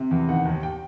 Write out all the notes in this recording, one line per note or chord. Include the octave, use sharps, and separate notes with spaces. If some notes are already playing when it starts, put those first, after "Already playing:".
Already playing: C3
E2
D#3 F#5
D#2
G5